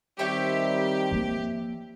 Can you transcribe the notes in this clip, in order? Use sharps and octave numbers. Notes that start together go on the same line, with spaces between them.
D#3 G3 C4 G4 C#5 E5 G5
F3 A#3